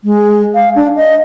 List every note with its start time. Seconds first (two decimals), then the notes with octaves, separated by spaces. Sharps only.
0.04 G#3
0.55 F5
0.76 D4
0.96 D#5